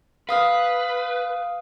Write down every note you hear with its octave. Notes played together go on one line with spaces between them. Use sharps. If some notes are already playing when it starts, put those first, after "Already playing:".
B4 F5 D#6 F6